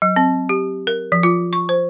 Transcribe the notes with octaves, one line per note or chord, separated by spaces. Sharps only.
F#3
C4
G4
A#4
F3
F4
C#6
C5